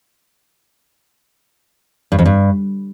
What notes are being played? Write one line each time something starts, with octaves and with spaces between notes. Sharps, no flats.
G2
F2
G2